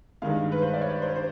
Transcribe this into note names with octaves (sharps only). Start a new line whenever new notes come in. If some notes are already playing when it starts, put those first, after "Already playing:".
G2 D#3 G#3 F5
B4
C5
D5
C#5
C5
C5